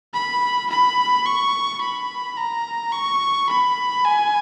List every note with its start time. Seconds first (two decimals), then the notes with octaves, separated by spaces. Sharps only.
0.14 B5
0.70 B5
1.26 C#6
1.81 B5
2.37 A#5
2.92 C#6
3.49 B5
4.05 G#5